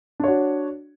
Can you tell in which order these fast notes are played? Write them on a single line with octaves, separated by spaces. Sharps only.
D4 C#5 F#4